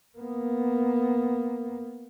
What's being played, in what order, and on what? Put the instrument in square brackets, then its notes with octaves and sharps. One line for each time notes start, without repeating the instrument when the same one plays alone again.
[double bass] A#3 B3